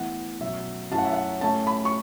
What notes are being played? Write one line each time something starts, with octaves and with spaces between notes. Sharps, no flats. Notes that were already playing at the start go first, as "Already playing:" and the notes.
Already playing: A2 E3 B3 E4 F#5
B2 F#3 C#4 E5
F#2 F#3 A3 C#4 E4 A5
F#5
E5
F#5
A2 A3 C#4 A5
B5
C#6